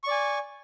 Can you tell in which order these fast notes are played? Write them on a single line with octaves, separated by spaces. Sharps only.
C#6 D5 G#5